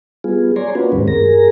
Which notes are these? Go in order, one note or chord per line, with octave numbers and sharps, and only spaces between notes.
G3 B3 F4 G#4
C#5 D5 G#5 A#5 C6
A#3 C#4 D4 F4 F#4 B4
D#2 G#2 D#3 G3 G#3 C4
G2 G#4 A#4 A#6